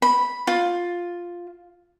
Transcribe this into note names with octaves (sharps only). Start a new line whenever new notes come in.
B5
F4